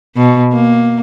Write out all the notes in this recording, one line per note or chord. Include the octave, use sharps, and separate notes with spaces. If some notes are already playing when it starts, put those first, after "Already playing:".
B2
A#3